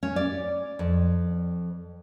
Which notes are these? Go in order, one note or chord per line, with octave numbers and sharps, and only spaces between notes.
C#4
D5
F2